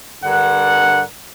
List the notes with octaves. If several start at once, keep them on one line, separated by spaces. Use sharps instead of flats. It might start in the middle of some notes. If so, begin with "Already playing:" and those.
G2 D3 A#4 F#5